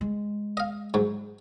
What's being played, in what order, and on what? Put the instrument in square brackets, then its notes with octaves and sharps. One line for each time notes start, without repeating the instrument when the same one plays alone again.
[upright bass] G#3
[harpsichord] D#5 F5
G#2 F#3